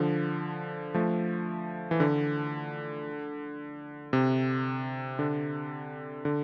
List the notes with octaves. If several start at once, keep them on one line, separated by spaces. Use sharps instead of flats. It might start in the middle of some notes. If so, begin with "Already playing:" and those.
Already playing: D3 F3
F3 A3
E3
D3
C3
D3
D3